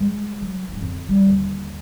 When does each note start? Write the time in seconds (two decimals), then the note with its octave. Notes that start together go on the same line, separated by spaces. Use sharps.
0.01 G#3
0.42 F#3
0.68 D1 E4
0.81 F2 D3
1.09 G3 A3
1.27 D#2 D3